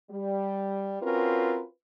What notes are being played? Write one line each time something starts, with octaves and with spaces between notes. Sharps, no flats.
G3
C4 C#4 F4 F#4 A#4 B4